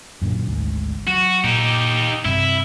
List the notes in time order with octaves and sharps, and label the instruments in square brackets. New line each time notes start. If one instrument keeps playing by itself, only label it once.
[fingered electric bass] F#2 A#2 D3
G#1 D2 G#2
[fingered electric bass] F#3 [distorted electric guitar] F#4
[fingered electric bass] A#2 [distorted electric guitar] D#4 G4
[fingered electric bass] G2 C3 [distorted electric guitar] E4